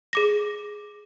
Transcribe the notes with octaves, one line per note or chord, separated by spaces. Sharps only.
G#4 D6 A#6